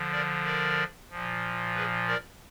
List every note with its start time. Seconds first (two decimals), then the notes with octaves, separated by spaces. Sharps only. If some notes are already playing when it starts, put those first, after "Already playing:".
Already playing: D3 F3
0.12 A#4 D5
0.44 A#4 D5
1.10 A#2 F3
1.75 G#4 B4
2.07 A#4 D5